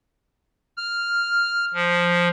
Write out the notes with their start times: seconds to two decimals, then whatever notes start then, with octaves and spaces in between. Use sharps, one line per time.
0.77 F6
1.74 F3